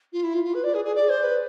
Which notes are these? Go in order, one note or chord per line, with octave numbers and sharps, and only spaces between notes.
F4
E4
F4
F4
B4
D5
G#4
G#4
D5
C5
B4